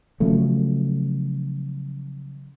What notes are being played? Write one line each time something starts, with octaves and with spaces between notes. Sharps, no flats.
C#3 F3 F#3 A3